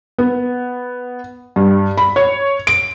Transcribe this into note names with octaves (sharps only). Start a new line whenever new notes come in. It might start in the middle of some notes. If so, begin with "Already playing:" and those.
B3
G2
B5
C#5
D7